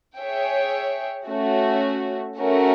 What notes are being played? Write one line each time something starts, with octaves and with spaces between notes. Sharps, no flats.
G#4 C#5 E5 G5
A3 C#4 F#4
A3 C#4 F#4 A#4